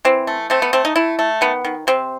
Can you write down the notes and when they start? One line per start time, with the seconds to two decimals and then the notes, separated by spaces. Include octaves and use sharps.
0.05 E3 C4
0.27 A3
0.50 A3 C4
0.62 B3
0.73 A3 C4
0.85 D#4
0.96 A3 E4
1.19 A3
1.41 D#3 B3
1.65 D#3
1.87 C3 C4